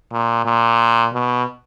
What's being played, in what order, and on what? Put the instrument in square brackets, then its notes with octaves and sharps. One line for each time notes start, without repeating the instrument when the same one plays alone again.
[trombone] A#2
A#2
B2